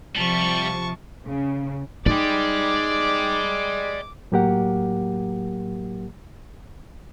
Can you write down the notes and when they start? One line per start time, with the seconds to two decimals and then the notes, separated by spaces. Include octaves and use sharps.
0.15 C3 F3 G3 A5 C#6
1.28 C#3
2.06 G#3 D#4 D5 G5 D6
4.32 A2 F#3 A#3 G4 A#4 F#5